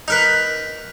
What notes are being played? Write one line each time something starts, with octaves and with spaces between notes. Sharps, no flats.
D#4 A#4 B4